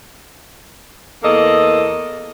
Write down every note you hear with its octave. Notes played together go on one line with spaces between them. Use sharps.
E2 A#3 A4 D#5